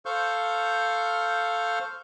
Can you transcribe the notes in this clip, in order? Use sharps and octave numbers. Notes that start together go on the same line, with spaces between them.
A4 C5 F5 C#6 F6 G6